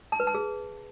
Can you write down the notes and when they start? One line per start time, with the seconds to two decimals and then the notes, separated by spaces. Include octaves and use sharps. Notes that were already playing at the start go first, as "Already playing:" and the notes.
0.12 A5
0.20 B4
0.27 A5
0.34 G#4